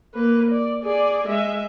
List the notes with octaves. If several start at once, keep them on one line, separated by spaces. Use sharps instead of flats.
A#3 B4
D5
G#4 D5
G#3 E5